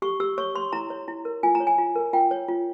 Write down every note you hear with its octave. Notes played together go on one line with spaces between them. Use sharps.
G4 C#6
G4 E6
C#5 C#6
C#5 C6
E4 A#5
C#5
E4
A#4
F4 G#5
A#5
C#5
G#5
F4
A#4
F4 G5
C#5
F4